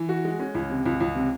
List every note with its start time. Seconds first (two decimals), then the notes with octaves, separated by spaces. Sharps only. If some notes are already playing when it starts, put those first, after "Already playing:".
Already playing: E3
0.09 F#4
0.25 G#3
0.40 C#4
0.55 C#2
0.70 C3
0.86 C#2
1.00 C#2
1.15 C3